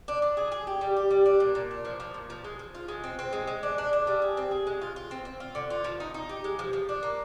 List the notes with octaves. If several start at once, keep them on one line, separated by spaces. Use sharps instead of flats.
D4
D4
G#4
G#4
G4
G3
G4
G3
D4
A#2
A#2
D4
F3
F3
A#2
F3
G#3
F3
F4
G#3
C4
C4
G#3
G#3
D4
D4
D4
G3
G#4
C4
G#4
G#3
F4
F4
C4
C4
F4
D3
F4
F3
D#4
D#4
G4
G#3
F3
F3
D4
A#3